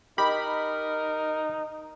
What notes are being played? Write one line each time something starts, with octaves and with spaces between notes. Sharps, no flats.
D#4 G4 A#4 D#5 B5